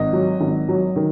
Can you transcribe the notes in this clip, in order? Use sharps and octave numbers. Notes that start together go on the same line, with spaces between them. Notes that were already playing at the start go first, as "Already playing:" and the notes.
Already playing: G#1 D#5
F#3
G#1
F#3
D#3